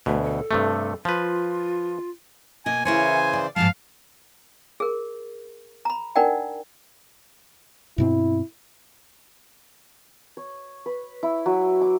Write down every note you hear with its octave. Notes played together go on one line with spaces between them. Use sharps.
D2 B2 A3
A4
G2 C3 A3
F3 F4 B4
B2 A#3 D#5 G#5
C#3 E3 E4 A#4 C5 C#5 G#5
D5
G#2 F3 G#3 F5 A5
G#4 A#4
A#5 B5
D4 D#4 A#4 D5 F#5 G5
G2 B2 C4 E4
C#5
B4
E4
F#3
D6